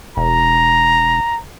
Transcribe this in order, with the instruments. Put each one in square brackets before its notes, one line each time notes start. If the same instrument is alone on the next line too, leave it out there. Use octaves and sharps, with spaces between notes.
[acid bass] E1 [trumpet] A#5